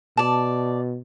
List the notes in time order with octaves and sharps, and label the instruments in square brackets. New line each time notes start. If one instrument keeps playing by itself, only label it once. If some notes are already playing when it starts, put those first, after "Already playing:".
[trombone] B2 [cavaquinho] D5 A5